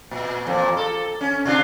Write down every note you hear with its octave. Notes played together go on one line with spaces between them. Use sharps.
A#2
F2 A#2
A4
C#4
C3 D4 F4